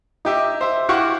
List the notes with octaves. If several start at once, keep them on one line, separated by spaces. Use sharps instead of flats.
D#4 G4 E5
C5 E5
E4 F#4 G4 F5 F#5 C#6